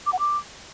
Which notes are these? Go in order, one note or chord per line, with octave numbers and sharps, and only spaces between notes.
D6
F#5
D6